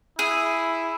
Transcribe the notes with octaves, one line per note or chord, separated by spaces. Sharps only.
E4 G#4